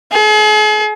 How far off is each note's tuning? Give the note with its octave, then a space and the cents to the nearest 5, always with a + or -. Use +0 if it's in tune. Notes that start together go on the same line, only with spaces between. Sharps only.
G#4 +40